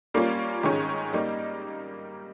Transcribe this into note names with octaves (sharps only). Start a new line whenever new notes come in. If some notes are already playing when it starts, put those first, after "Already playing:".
G3 A#3 C#4 F4
G#2 D#3 G#3 C#4
G3 A#3 D#4